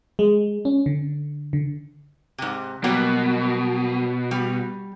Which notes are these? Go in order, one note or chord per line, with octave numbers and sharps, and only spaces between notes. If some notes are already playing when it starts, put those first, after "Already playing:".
G#3
C#4
D3
D3
G#2 C3
B2 F#3 G3 A#3
G3